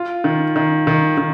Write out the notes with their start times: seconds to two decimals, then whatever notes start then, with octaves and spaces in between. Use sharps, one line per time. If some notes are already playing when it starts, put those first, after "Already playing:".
Already playing: F4
0.24 D#3
0.56 D#3
0.87 D#3
1.18 D#3